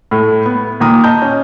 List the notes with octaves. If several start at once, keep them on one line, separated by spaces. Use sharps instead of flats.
A2 A3
B3
D#2 A#2 A#5 D#6
D#5 A5 A#5 G6
C#4